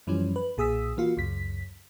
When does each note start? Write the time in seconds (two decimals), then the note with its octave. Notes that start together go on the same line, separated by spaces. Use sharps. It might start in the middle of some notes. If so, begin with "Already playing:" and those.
0.07 F#2 E3 F3 G3 C#4
0.36 B4
0.57 B1 A#2 G#4 D#6 E6 B6
0.97 E3 A#3 F4 F#4
1.17 C#2 F#2 B6